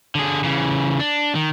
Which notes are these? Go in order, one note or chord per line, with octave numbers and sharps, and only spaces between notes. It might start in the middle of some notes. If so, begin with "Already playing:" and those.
D3 G#4
C#3 E3
D4
D#3